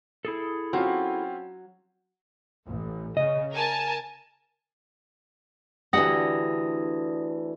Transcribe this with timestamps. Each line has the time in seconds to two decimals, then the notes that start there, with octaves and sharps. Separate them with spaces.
0.25 E4 G#4 A4
0.73 F#3 C4 C#4 F4
2.66 A1
3.17 C#3 D#5
3.52 A#4 G#5 A5
5.93 D2 D3 E3 G4 F#5 D#6 A#6